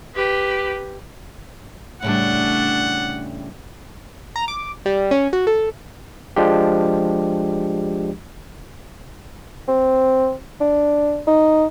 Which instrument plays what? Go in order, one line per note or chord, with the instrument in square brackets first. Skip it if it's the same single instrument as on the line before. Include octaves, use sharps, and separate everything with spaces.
[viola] G4 B4
[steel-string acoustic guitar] A2 C#3 G3 [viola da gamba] A3 D4 [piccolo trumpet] F#5
[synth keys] A#5
D6
G3
C#4
F#4
A4
[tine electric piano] F3 G#3 D4 G4
[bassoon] C4
D4
D#4